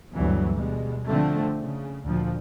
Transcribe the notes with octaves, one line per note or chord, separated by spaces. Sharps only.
D2 G2 E3 F#3 B3
B2 G3 G#3
D3 F3 A3 C4
C#3
D2 A#2 F3